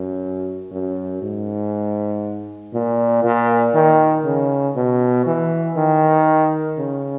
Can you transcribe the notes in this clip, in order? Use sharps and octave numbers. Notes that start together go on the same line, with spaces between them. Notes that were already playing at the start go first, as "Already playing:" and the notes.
Already playing: F#2
F#2
G#2
A#2
A#2
D#3
C#3
B2
E3
D#3
C#3